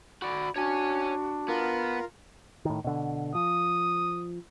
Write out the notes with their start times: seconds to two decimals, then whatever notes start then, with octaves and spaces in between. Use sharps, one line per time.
0.22 F#4 D5 B5
0.56 D4 F#4 C#5 G#5
1.48 B3 F4 A#4
2.65 A2 D#3
2.84 B2 D3
3.35 F3 D#6